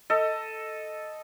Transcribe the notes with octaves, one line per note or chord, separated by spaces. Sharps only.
A4 D#5